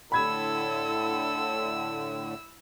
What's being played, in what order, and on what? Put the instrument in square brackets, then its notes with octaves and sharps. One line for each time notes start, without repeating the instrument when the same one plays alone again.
[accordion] A2 D3 [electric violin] E4 E6 [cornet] A4 [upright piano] B5 G#6